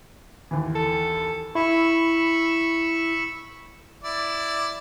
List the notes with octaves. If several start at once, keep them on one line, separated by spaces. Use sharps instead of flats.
D#2 E3
A4
E4 B5 C#6 E6
E4 D5